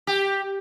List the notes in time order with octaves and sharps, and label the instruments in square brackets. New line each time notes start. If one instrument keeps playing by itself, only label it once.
[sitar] G4